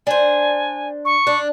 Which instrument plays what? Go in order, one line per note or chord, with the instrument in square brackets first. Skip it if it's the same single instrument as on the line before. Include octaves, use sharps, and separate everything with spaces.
[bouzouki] D4 C5 [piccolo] G#5
[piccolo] C#6
[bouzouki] D4